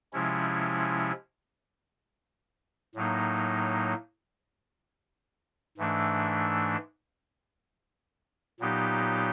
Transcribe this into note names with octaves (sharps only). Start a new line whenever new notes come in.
C3 F3 G#3 C#4 E4
A2 F#3 A#3 D#4
G#2 E3 A3 D4
A#2 F#3 B3 D#4 G4